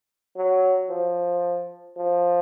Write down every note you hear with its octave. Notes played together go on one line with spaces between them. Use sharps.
F#3
F3
F3